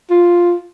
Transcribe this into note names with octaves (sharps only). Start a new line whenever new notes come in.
F4